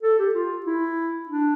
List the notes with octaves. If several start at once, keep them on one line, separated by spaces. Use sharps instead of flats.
A4
G4
F4
E4
D4